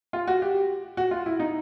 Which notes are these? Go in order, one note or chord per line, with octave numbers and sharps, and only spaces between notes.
F4
F#4
G4
F#4
F4
E4
D#4